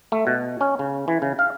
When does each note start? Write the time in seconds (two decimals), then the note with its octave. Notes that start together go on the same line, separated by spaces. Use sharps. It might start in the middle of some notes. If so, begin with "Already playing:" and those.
0.12 A3
0.27 B2
0.61 C#4
0.79 C#3
1.08 E3
1.22 C#3
1.39 F5